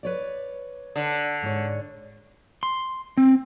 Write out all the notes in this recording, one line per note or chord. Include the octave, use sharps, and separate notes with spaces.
B4 C#5 D5
D3
G#2 C#5
C6
C4